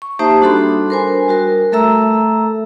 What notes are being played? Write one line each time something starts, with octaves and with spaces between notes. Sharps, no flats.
C#6
A#3 D#4 G4 C5 E5 A5
G3 D4 F#4 A4 B5 C6
A#4 C5 G#5
G3 F#4 A#4
A3 A4 E5 A#5 E6